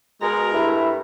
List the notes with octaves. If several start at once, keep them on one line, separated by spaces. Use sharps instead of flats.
B2 G#3 A#4 A#5
G2 A3 E4